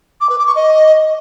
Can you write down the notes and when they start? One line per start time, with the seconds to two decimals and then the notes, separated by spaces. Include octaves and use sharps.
0.21 D6
0.29 B4
0.38 D6
0.47 C#6
0.56 D#5